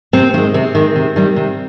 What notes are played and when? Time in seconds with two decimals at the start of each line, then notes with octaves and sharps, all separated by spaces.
0.13 C3 C4
0.34 D#3 A#3
0.38 G#3
0.54 C3 C4
0.75 D#3 G#3
0.96 C3
1.16 D#3 G3
1.36 C3